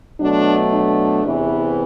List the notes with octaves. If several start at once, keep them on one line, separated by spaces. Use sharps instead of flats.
B2 F#3 A3 D4
D4
E2 C3 E3